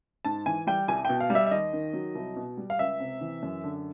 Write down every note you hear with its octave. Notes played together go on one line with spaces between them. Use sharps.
G#2 A5
E3 G#5
G3 G5
C2 G#5
B2 G5
F5
G3
E5
E5
D#2 D#5
D#3
F#3
C2
B2
G3
F5
C#2 E5
C3
E3
F#2
D3